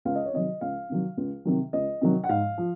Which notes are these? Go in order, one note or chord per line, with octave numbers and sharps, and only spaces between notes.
C#2 F5
D#5
C#5
C3 D#3 F#3 D#5
C#2 F5
C3 D#3 F#3
C#2
C3 D#3 F#3
C#2 D#5
C3 D#3 F#3
F#5
G#2 F5
F3